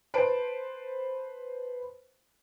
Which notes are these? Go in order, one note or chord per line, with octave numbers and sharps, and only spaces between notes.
B4 C5 A5 D7